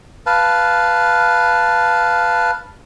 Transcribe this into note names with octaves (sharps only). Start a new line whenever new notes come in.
B4 F5 A5